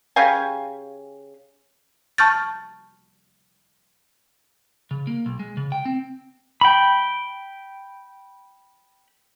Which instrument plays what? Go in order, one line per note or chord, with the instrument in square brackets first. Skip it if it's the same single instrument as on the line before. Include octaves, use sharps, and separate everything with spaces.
[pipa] C#3 G4 F5 G#5
[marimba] A5 C#6 F6 G6 A6
[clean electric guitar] C#3
A#3
B1
G#3
C#3
G5
C4
[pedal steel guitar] G5 B5